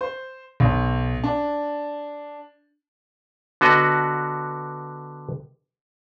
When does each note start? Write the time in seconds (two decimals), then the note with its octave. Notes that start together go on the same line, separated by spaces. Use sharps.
0.01 C5
0.60 B1
1.24 D4
3.61 D3 B3 F#4 D#5